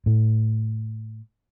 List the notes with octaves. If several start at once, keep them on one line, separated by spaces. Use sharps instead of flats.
A2